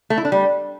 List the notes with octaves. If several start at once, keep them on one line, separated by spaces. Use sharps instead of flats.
A3
E4
D4
G3